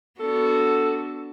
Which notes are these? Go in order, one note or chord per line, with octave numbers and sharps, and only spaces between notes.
B3 D4 F#4 A4